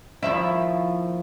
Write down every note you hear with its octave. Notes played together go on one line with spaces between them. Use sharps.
D#2 F3 E4